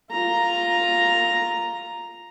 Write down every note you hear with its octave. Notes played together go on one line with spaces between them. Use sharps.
F4 A#5